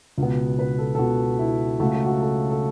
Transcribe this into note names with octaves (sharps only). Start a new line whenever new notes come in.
C#2 B2 B3
B4
A4
A4
C#2 B2 B3 F#4
E4
C#2 C#3 F#3 A3 F#4
A4
F#4
A4
A4